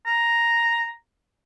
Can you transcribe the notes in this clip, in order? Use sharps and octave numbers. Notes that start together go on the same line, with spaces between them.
A#5